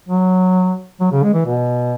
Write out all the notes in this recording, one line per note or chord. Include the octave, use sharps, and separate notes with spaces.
F#3
F#3
C#3
G#3
E3
B2